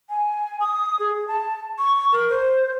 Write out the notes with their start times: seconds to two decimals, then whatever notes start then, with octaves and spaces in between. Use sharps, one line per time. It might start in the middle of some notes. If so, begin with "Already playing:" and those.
0.10 G#5
0.60 D#6
0.99 G#4
1.28 A5
1.78 C#6
2.12 A#4
2.29 C5